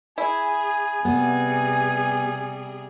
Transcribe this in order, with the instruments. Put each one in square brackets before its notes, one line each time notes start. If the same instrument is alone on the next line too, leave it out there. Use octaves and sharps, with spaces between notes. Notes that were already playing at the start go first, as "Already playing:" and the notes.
[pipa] E4 [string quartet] G#4 [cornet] G#5
[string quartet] C3 G3 G#4 [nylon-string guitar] B3